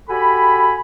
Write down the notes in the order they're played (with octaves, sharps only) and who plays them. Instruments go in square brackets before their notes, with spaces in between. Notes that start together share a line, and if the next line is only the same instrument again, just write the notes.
[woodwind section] F#4 G4 A4 G#5 B5